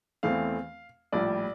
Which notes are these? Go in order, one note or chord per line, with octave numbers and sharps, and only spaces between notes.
E2 E3 A3 C4 F5
A#1 A2 G3 D5